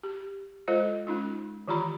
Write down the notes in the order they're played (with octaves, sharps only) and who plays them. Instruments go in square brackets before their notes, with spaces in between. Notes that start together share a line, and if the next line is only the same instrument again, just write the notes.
[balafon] G4
G#3 F4 A4 C5 D#5
G#3 C#4 D#4 F4
D#3 E3 F4 G4 A#5 B5